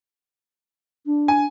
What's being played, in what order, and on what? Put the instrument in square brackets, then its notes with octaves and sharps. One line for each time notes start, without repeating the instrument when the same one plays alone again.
[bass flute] D4
[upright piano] G#5